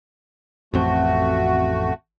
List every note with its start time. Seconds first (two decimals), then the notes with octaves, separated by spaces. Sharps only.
0.74 A1 F2 A3 C4 F#4